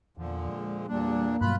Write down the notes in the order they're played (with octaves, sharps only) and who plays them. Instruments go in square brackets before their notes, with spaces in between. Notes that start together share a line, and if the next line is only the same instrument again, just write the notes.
[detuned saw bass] E2 [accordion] A#2 D3 F3
[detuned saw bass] G#3
[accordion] E2 A#2 D4 [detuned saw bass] G3 [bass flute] A#3
[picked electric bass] G2 F#3 [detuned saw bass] B2 [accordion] F4 B5 F#6